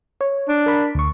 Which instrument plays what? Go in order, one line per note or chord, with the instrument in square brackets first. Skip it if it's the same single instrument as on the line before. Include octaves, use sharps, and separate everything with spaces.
[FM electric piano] C#5
[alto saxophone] D4
[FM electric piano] A#4 B5
D2 C#6